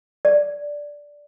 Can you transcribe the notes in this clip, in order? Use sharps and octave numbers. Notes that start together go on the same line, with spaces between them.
D5